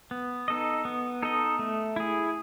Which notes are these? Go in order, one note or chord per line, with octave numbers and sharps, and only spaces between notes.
B3
D#4 A4 D#5
B3
D#4 A4 D#5
A3
E4 G#4